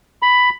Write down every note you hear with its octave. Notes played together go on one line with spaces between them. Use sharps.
B5